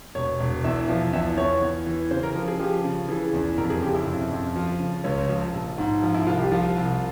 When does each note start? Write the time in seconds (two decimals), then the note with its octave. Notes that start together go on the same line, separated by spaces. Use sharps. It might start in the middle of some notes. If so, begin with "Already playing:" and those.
0.15 E1 C#5
0.40 E1
0.64 E2 E5
0.88 F3
1.13 E2 E5
1.38 E2 C#5
1.62 E2
1.86 E3
2.11 C#3 C5
2.23 A#4
2.35 F3
2.48 G#4
2.59 F3 G4
2.84 C#3
3.09 E3 G#4
3.33 E2
3.57 F2 A#4
3.70 G#4
3.82 C#3 G4
3.94 E4
4.06 F2
4.31 F2
4.56 F3
4.80 C#3
5.04 C#2 C#4
5.29 F3
5.53 A#1
5.78 G#2
6.02 F3
6.14 E4
6.26 C2 F4
6.39 G4
6.51 F3 F4
6.76 C2